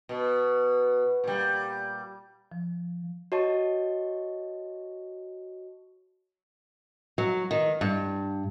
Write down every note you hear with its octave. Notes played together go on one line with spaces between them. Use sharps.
B2
A#2 G3
F3
F#4 C#5 D#5 A5 C#6
F#3
D#3
G2